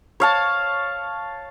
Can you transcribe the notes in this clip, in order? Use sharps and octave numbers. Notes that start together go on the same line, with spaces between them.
C#5 F5 A5